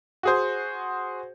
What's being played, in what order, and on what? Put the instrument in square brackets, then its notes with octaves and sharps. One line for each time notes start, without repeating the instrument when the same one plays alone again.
[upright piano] F#4 G#4 C5